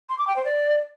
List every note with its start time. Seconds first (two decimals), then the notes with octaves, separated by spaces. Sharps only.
0.09 C6
0.18 D6
0.27 G5
0.36 C5
0.45 D5